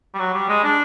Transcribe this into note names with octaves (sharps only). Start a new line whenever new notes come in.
G3
F#3
G3
G#3
D4